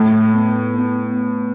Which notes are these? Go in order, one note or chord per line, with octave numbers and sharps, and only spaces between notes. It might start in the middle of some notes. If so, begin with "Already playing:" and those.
Already playing: A2 A3
B3
B3